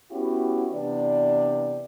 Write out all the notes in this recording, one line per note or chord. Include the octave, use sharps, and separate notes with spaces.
B3 C#4 E4 F#4 G4
C3 E3 B3 D4 D5